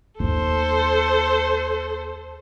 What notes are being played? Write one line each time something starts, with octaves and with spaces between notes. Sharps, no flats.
D#2 D#4 A4 C5